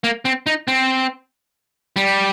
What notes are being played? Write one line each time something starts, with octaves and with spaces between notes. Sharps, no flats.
A#3
C4
D#4
C4
G3